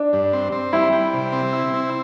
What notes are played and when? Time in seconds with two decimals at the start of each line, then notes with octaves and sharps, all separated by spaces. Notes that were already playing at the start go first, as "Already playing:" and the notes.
Already playing: D4
0.13 G2
0.33 C4
0.52 C4
0.73 G3 E4
0.93 G3
1.14 C3
1.32 C4
1.53 E4
1.74 C4